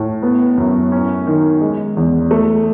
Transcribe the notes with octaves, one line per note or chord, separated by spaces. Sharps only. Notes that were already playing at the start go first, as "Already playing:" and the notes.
Already playing: A2
B3
F#2
C#4
D#3
G#3
E2
A3